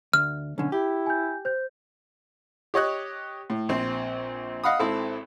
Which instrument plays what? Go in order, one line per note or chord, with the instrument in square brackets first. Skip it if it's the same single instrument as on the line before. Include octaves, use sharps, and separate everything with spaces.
[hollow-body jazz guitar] D2 [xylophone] F6
[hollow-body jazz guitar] B1 D3 [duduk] C#4
[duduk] E4 [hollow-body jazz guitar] G4
[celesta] G#5 G6
C5 G6
[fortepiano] G4 C#5 D#5 F#6
A2
A#1 C4
D#5 F5 F#5 B5 D#6
G#1 C4 E4 A4